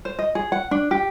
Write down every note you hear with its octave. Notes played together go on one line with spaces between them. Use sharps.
C5
D#5
G#4
F#5
D4
G4